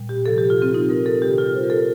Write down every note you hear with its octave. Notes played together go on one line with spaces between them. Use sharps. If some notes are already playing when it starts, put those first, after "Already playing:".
Already playing: A#2 G3
G4
C3 F3 A4
G4
F4
C4
D#4
A#4
A4
C3 D#3 G3 G4
F4
C5
A#4
A4